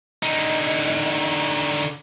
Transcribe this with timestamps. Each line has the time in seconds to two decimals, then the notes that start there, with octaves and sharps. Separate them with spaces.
0.23 D3 D#4